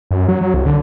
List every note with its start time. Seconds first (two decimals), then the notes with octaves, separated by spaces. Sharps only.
0.11 F#2
0.29 F#3
0.41 F#3
0.54 C2
0.66 D3